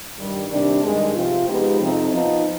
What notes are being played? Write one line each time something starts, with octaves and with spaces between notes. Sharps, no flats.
G2 D#3 G3
C3 D#3 G3 D4
G2 D#3 G#3
C3 F3 C4 F4
F3 G#3 B3 D#4 G4
F2 C3 F3 C4 D#4
F3 B3 D#4